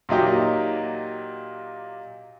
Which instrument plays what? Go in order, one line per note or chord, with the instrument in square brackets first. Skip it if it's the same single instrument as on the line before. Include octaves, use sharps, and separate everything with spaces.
[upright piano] A#2 F#3 D#4 G4